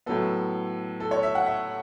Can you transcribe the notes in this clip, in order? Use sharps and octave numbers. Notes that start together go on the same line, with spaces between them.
A2 F#3 B3 A4
A4
C#5
E5
F#5
E5